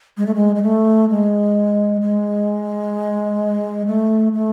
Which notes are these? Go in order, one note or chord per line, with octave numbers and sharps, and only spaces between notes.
G#3
A3
G#3
G#3
A3
G#3
G#3
A3
A3